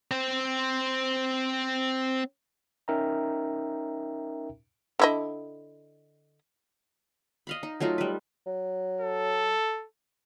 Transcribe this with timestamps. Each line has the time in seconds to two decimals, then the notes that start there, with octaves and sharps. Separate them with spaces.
0.11 C4 C5
2.88 C#4 D#4 A#4 E5 G5 A#5
4.99 D3 E4 D#5
7.47 D#5 F5 B5
7.63 D#4
7.80 F#3 A3 D#4 F4
7.98 G3 B4
8.46 F#3
9.01 A4